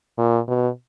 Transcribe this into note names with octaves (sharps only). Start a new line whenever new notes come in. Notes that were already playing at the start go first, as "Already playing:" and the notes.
A#2
B2